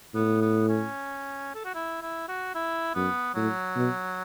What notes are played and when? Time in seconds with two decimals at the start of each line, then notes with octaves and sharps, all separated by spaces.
0.14 A2 B3
0.42 B3
0.69 C#4
1.55 A4
1.65 F#4
1.75 E4
2.02 E4
2.29 F#4
2.55 E4
2.95 F#2 B3
3.35 A2 F#3
3.75 B2